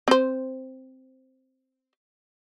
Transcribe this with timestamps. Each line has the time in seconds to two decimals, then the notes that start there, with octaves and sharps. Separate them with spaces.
0.08 C4 C5